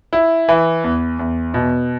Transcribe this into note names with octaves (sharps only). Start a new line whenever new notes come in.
E4
E3
E2
E2
B2